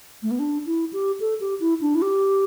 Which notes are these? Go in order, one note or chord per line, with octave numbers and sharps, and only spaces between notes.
A3
B3
D4
E4
G4
A4
G4
E4
D4
E4
G4